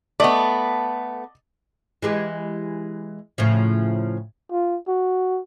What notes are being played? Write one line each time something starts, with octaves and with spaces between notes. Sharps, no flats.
A3 B3 D5 D#5
E3 G#3 G4
A2 C#3 F3
F4
F#4